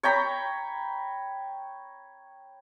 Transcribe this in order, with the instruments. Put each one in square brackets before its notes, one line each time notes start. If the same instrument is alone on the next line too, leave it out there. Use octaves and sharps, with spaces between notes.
[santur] C#5 G5 A#5 B5